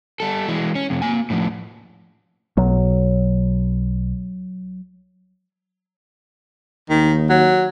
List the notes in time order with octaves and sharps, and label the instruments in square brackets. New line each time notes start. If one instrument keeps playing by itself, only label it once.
[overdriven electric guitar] G3 A4
E3 G#3
C#4
F2 C3
A#3 G#5
A2 F3
[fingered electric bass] B1 [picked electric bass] F#3
[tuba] D#2 [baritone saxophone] D#3
[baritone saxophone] F#3